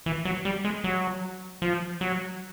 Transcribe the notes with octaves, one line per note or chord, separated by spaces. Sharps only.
E3
F#3
G3
G#3
F#3
F3
F#3